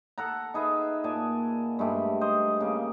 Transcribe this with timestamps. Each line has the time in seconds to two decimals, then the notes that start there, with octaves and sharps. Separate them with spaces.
0.18 A4 F#5 A#5
0.54 D#4 G#4 B4 E5
1.04 A#2 D5 G#5 A5
1.79 G2 G#3 A3 G4
2.21 C5 D#5
2.60 C#3 A#3